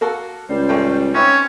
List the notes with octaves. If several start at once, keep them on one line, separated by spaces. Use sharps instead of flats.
A#3 F#4 A4
C#2 G3 C5
A1 A3 G5
C4 C#4 D#4 F#4 B4 C#5 E5